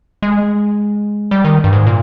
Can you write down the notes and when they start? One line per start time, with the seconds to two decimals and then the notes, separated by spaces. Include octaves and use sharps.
0.22 G#3
1.31 G3
1.45 D#3
1.64 G2
1.73 G#2
1.87 A#2